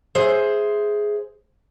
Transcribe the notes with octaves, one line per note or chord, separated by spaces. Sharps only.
G#4 C5 E5